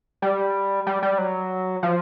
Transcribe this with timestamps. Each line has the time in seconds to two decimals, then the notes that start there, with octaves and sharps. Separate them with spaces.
0.22 G3
0.87 G3
1.02 G3
1.18 F#3
1.83 F3